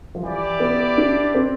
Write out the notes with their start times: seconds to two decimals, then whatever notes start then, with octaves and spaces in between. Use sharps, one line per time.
0.15 F3
0.23 E3 E4 G4 D5
0.60 B3
0.98 D4
1.35 C4